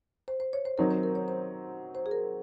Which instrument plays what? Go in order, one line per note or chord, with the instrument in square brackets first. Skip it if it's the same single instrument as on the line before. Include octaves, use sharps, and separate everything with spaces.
[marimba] C5
C5
C#5
C5
[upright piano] D#3 F#3 C4 D#4 [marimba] A#4
[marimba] C5
A#4
C#5
C5
C5
G#4
A#4